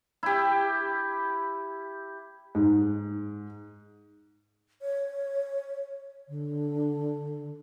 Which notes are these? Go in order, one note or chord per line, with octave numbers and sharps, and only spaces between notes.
E4 G4
G#2
C#5
D3